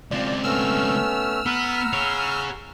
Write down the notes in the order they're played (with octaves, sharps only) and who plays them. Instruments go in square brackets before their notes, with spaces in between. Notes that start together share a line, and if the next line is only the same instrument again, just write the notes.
[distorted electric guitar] C#2 C4 [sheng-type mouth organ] F4 [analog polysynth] D5
[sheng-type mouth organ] A3 B3 C#4 [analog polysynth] E6 F6
[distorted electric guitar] B3 [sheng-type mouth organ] F#5 A#5 B5
[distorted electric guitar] G#4 C#5